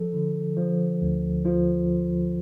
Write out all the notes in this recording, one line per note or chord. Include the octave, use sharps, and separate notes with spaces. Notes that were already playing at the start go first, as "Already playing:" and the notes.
Already playing: F3 A4
D3
F3
D2
F3 F4